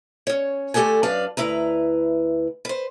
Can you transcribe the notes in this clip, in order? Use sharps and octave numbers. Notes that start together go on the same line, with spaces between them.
C#4 C#5
D3 A3 G4 A4 F#5 G#5
F#2 D4 B4 D5 F5
D2 E4 B4 A#5
B4 C5